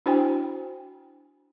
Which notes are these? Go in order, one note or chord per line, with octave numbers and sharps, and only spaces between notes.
D4 E4 F#4 C5 G5 G#5